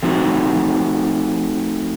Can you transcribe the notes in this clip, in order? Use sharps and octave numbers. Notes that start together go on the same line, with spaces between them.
F3 A3 C4 D#4 F#4